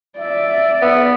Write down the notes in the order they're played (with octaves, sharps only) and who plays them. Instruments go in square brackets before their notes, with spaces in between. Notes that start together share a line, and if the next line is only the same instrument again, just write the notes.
[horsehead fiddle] D5 [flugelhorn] E5
[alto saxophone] B3